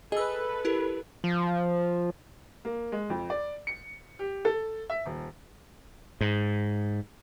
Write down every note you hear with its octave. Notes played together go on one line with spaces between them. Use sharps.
G#4 A4 B4 D#5 E6
E4 G4 A#4
F3
A#3
G#3
F2
D5
C#7
G4
A4
E5
D#1
G#2